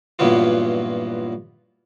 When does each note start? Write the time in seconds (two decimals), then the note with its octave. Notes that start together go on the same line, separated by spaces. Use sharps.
0.19 G2 A#2 E3 F#3 B3 F4